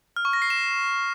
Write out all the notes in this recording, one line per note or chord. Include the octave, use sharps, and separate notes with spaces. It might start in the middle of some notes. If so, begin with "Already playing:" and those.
F6
C#6
A#6
C7
E7